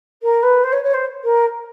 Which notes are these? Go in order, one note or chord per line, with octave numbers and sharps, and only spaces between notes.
A#4
B4
C5
C#5
C#5
C5
A#4